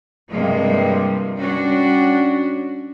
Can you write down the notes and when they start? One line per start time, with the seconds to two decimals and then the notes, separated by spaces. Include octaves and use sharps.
0.30 G2 C3 F3 G3 G#3 A#3
1.37 G3 C#4 D4 F#4